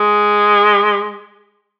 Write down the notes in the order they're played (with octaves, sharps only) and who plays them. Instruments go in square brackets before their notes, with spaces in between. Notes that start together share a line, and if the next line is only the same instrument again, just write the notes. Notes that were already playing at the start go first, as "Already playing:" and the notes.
Already playing: [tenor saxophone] G#3